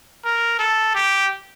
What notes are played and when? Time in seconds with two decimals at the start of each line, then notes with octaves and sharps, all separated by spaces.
0.24 A#4
0.59 A4
0.95 G4